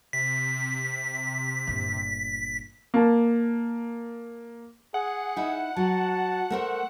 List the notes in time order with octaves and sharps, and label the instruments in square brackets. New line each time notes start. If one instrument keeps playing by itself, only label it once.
[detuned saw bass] C3 [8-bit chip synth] B6
[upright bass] G1 A#2
[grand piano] A#3 A5
[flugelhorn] G#4 [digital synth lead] F#5
[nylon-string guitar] D#4 E4
[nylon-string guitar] F#3 [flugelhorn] A5
[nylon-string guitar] A3 A#4 C5